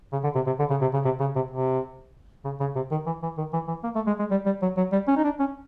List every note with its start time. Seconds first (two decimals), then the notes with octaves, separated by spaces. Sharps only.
0.12 C#3
0.24 D3
0.35 C3
0.46 C3
0.59 D3
0.70 C#3
0.81 C3
0.94 C#3
1.05 C3
1.20 C#3
1.36 C3
1.51 C3
2.45 C#3
2.60 C#3
2.76 C3
2.91 D#3
3.06 E3
3.23 E3
3.38 D#3
3.53 E3
3.68 E3
3.84 A#3
3.95 A3
4.07 G#3
4.19 G#3
4.31 G3
4.46 G3
4.62 F#3
4.77 F#3
4.92 G3
5.08 C#4
5.17 D#4
5.24 D4
5.39 C#4